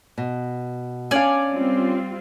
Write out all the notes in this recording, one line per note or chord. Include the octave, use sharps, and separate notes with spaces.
B2
C#4 D4 D5 F5 G#5
G3 C4 F4